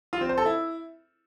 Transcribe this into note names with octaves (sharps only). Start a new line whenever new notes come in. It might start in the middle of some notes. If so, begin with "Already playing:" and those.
F4
C4
C5
A4
E4